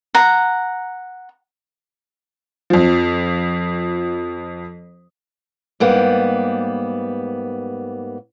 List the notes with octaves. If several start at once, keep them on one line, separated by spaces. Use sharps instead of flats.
F#5 A#5
F2 F3
G#2 G3 A#3 B3